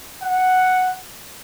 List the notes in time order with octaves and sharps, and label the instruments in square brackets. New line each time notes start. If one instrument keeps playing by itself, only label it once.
[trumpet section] F#5